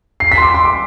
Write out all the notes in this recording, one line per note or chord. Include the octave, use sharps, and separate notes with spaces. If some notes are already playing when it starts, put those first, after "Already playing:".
C7
B6
C6
D6
C6
D6